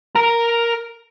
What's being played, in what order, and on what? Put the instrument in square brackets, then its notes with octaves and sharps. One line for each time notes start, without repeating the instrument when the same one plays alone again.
[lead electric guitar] A#4 A#5